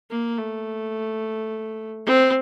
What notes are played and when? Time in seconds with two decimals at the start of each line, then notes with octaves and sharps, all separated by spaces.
0.10 A#3
0.37 A3
2.06 C4